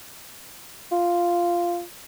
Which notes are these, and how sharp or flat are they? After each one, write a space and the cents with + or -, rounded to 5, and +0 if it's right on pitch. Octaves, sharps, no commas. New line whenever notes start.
F4 -5